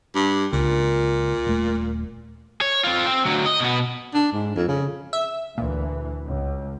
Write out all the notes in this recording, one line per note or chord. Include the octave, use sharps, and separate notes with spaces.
G2
C#2 A#2
D#1 A3
C#5
C4 F4
C4
D2 F#3
D#5
B2 B3
D4
G#2
F2
C#3
E5
D2 A#2 E3
C#2